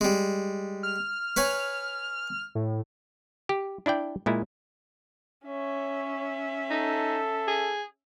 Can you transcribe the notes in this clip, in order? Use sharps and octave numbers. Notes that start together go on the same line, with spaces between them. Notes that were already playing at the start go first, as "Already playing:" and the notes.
G3 G#3
F6
B4 C#5 G#5
A2
G4
D4 E4 D5 G5
A#2 G#3 E4
C#4 C#5 E5
D#4 A4
G#4